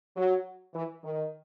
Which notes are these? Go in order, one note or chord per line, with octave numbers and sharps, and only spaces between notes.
F#3
E3
D#3